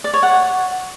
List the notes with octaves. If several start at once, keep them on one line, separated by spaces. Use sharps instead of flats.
D5
C#5
F#5